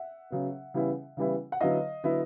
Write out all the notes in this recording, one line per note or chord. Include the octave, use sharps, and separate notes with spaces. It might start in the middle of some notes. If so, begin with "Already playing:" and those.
Already playing: E5 F#5
C#3 F#3 B3
C#3 E3 G3 B3 E4
C#3 E3 G3 B3 E4
F#5
D3 F#3 B3 E4 D#5 F5
D3 F#3 B3 E4